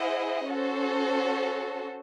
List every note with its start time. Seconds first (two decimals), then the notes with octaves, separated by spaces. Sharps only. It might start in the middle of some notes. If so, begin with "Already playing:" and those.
Already playing: E4 G#4 C5 D#5 F#5
0.50 C#4 F#4 A4 C5